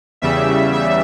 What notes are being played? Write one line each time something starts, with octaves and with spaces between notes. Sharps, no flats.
E2 C#3 G3 E5
E5